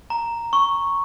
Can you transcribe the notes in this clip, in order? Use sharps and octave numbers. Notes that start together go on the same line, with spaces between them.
A#5
C#6